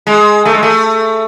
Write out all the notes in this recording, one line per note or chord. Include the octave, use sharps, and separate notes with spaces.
G#3
A3
G#3
A3